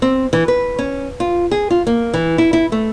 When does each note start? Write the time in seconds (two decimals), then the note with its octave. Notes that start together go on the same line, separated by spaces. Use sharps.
0.02 C4
0.33 E3
0.48 B4
0.79 C#4
1.20 F4
1.51 G#4
1.70 F4
1.87 A#3
2.14 E3
2.38 E4
2.53 E4
2.72 A3